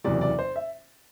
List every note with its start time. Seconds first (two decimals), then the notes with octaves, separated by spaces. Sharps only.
0.04 F#1 E2 C3 F#3 D5
0.21 D5
0.39 C5
0.56 E5